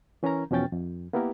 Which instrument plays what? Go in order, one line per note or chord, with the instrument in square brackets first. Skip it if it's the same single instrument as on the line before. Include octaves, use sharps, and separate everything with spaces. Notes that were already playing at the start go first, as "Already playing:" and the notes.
[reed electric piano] E3 C#4 E4 A#4 A#5
E2 B2 F3 C#4 G5 A6
F2
A#3 B3 E4 G4 A#4